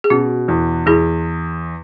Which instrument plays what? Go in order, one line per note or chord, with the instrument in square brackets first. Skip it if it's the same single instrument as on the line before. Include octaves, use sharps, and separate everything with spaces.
[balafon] G#4
[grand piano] B2 [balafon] C#4 F#4
[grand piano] E2
[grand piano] E2 [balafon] E4 G#4